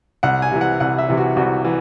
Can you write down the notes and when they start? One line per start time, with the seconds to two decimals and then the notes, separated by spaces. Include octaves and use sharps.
0.23 C2 F#5
0.42 G#5
0.51 C3 E3
0.61 F#5
0.80 C2 F#5
0.98 E5
1.09 C3 E3
1.17 F#4
1.37 C2 F#4
1.65 E3